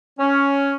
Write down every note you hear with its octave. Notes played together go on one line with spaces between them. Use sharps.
C#4